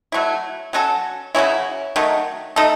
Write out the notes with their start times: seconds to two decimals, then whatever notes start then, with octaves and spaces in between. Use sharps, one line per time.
0.12 F#3 A3 E4
0.73 F#3 C#4 F#4 A4
1.35 C#3 F#3 C#4 E4
1.96 D#3 F#3 A3
2.56 A3 D#4 A4